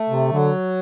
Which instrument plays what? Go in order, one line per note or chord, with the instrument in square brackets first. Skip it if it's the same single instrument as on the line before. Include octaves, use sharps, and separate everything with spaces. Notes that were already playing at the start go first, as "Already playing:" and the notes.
Already playing: [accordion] A3
[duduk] C3
[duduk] D3 [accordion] F#3